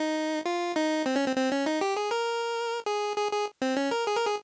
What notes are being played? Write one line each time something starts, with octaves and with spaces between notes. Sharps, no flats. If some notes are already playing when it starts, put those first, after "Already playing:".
Already playing: D#4
F4
D#4
C4
C#4
C4
C4
C#4
D#4
G4
G#4
A#4
G#4
G#4
G#4
C4
C#4
A#4
G#4
A#4
G#4